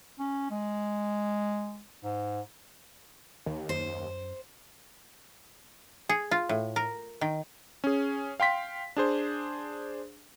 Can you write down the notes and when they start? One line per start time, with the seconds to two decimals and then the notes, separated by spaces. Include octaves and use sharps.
0.19 C#4
0.51 G#3
2.04 G#2
3.46 D#2
3.69 F#2 C5
6.09 G#4
6.31 F4
6.49 A2
6.76 A#4
7.21 D#3
7.84 C#4 G#4
8.40 F5 G5 C6 B6
8.96 D4 G#4 C5